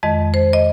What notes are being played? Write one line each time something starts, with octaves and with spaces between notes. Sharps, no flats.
F2 D#3 G#3 D#5
C5
D#5